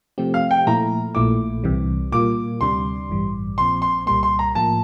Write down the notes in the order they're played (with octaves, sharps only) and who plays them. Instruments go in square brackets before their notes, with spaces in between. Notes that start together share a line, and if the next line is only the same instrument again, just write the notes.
[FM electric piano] C3 F3 A3 C4 G4
[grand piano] F5
G5
[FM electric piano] A#2 F3 A3 E4 [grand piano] A#5
[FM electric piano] A#1 A#2 A3 E4 [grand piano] D6
[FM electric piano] C2 C3 E3 G3
[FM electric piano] A#2 G3 A#3 F4 [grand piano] D6
[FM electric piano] D2 C3 G3 D4 [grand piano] C6
[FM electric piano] A1 G2 E3 G3
[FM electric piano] A#1 A#2 F3 C4 [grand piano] C6
[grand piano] C6
[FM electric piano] C2 A#2 G3 A#3 [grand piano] C6
[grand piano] C6
A#5
[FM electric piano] A2 F3 A#3 F4 [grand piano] A5